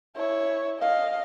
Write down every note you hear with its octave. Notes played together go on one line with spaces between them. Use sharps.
E4 C#5
D#5 F5